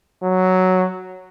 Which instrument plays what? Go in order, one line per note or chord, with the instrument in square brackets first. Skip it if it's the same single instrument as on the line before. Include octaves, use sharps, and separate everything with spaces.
[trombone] F#3